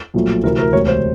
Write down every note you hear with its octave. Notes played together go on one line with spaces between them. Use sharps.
B1 A#2 F3 A3
D2 C3 E3 A#4
A#4
E1 D2 C3 C#5
C5